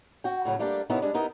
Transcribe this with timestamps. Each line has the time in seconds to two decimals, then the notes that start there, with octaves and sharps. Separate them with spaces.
0.24 F#4 G5
0.45 A2 C#3 F#3
0.59 G3 A3 A#3 D4 F4 G4
0.90 C3 B3 C#4 D#4 E4 A#4
1.02 G3 G#3 D4
1.14 B3 D#4 E4 A#4